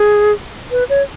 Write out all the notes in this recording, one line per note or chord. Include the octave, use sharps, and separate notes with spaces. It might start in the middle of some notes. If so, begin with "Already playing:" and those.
Already playing: G#4
B4
C#5